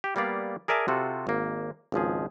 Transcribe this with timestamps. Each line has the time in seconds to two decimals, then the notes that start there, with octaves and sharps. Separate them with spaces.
0.04 G4
0.16 G3 A#3 B3 D5 F5
0.68 G#4 A#4 D5 E5 G#5 A5
0.88 C3 F4 F#4 A4
1.27 G#1 A#3
1.92 G#1 C#2 F3 G#4